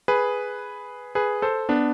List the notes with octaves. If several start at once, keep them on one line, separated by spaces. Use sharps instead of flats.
G#4 B4
G#4 B4
A4 C5
B3 D4